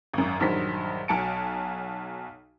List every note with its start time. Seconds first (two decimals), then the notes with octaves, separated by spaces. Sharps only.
0.14 G#1 F#2
0.40 A#1 G2 D#3 F#3 C5 B6
1.08 B1 F#3 G#5 A5 C#7 D7